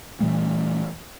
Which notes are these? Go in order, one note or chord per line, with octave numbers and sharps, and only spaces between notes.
A#2 E3 G3 A3